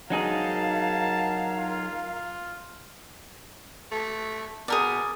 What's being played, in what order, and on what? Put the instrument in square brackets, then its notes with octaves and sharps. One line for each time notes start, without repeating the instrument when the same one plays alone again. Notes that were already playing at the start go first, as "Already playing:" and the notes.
[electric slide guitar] F#3 D#4 G#4 [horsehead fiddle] A#4 F5 [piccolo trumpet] A5
[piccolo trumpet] F4
[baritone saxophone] A3
[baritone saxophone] B2 [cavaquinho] G#4 A#4 D5